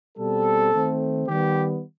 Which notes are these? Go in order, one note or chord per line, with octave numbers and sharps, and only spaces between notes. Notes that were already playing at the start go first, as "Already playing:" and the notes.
B2 G3 C4 A4
D#3 A3 C4
D#3 G3 B3 G4